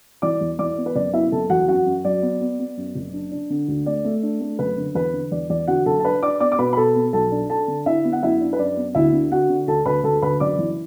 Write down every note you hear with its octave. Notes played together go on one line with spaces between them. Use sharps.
E3 D5 D6
E2
E3 D5 D6
B3
B4
F#1 D5
B3 E4 E5
F#1 A4 A5
E2 F#4 F#5
F#2 F#4 F#5
F#2
F#3 D5
B3
B3
B3
F#2
F#1
D4
D4
D3
D2
A3 D5
A3
D4
A3
F#1 B4
D3
E2 B4
D3
E2 D5
E2 D5
D3 F#4 F#5
F#1 A4 A5
A5
D4 B4 B5
D4 D5 D6
B3 D5 D6
D6
B2 B4 B5
B5
B2 A4 A5
B3
B1 A4 A5
D4
D4 A4 A5
D3
D3 E4 E5
B3
F#5
F#2 E4 E5
D4
B4
F#2 D5
B3
D2 E4 E5
D3
D3 F#4 F#5
D3
D2 A4 A5
D2 B4 B5
D2 A4 A5
D2 B4 B5
F#1 D5 D6
E3